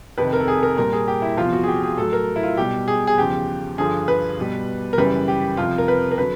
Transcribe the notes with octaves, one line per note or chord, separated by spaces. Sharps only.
F2 C3 D#3 B4
A#4
A4
G#4
A#4
A#2 G3 A#4
G#4
G4
E4
E2 C3 F3 F4
F#4
G#4
G4
G#4
A2 F#3 A4
A#4
E4
F4
B2 G3 G4
G#4
G#4
E2 C#3 F3 G4
G2 D3 F3 G#4
B4
B2 G3
A#4
F#2 C#3 E3 G3 B4
G4
F2 C3 F3 F4
A#4
B4
A#4
D3 F#3 B4